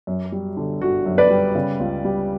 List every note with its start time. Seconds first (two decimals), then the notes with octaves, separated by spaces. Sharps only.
0.07 F#2
0.32 G3
0.57 D3
0.81 G1 F#4
1.06 F#2
1.18 B4 D5
1.30 G3
1.55 C#3
1.80 C#2
2.05 G3